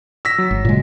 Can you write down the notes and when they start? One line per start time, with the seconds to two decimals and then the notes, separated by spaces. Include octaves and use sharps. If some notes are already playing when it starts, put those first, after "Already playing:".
0.25 E6 A#6 B6
0.38 F#3
0.51 G#1
0.65 A#2 C#3 G#3